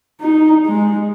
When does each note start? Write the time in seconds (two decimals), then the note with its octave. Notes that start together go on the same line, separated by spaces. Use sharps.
0.21 D#4
0.65 G#3